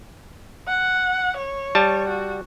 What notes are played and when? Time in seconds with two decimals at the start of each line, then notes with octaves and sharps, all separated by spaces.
0.68 F#5
1.37 C#5
1.75 G3 A5
2.08 F#4